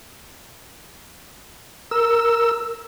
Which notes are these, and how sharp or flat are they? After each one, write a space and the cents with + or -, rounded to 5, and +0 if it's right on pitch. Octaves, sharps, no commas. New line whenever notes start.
A#4 +0 E6 +0